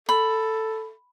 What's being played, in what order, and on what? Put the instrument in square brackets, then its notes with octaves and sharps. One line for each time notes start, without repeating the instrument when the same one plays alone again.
[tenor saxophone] A4 [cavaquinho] B5